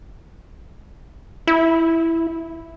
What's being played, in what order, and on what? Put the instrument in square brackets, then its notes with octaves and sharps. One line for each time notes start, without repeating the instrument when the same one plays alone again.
[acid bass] E4